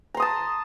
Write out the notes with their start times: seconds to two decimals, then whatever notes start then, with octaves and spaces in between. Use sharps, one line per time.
0.14 A#5
0.17 C6
0.20 D#6
0.22 A5